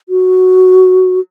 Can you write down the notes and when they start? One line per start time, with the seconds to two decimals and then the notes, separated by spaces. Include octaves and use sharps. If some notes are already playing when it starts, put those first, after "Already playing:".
0.09 F#4